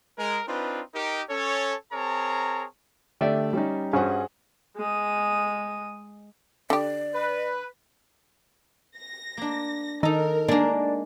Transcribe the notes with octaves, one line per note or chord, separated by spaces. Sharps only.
G#3 A#4
C4 D4 D#4 F4 B4
D#4 G4 A#4
C#4 A4 C#5
C4 G#4 A#4 C#5 A5 A#5
D3 A3 G4 D5 E5 G5
G3 C#4 D#4
G2 C#4 F#4 G#4 C5 F#5
G#3 D#6
D3 G4 D5
B4
A#6
A#3 D4
D#3 D#4 A4 A#4
G#3 A#3 D4